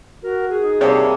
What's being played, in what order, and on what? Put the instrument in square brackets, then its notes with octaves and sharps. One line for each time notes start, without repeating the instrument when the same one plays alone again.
[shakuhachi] F#4 [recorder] A#4
[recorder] G#4
[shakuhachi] D#4
[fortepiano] C3 G4 C#5 [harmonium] G3 A#3 D4